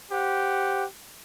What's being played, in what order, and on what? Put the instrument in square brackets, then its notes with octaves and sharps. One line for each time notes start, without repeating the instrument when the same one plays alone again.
[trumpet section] G4 C5 F#5